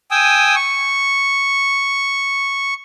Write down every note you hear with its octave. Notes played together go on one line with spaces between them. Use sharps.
G5 G#5 D#6 E6
C#6